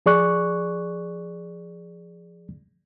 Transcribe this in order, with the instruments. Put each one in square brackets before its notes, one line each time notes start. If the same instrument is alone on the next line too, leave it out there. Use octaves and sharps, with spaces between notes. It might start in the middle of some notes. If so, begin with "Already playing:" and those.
[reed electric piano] F3 G#4 D5 C#6 F#6